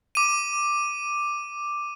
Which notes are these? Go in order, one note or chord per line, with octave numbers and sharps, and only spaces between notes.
D6 D#7